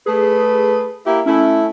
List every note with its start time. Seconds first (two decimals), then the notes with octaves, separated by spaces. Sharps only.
0.06 A3 G#4 B4
1.06 A#3 E4 G4
1.26 A3 C#4 E4